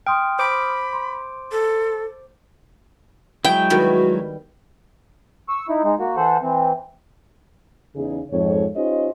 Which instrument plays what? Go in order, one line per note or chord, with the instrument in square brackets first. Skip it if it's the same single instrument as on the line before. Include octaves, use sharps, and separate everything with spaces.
[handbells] G5 [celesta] C6 D#6 F6
[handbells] C5 D6 D7 [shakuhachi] B5
[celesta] C6
[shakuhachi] A4
[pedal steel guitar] F#3 G#3 E4 [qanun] G5
[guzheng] D#3 G3 B3 [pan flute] F#4
[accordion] C#6 E6
D#4 E4
G#3 D#4
A#3 F#4
E3 A4 C5 F#5
E3 C4
[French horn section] E2 C#3 D#4 G#4
F2 G#2 C#5
C#4 D#4 F4 G4 C5 D#5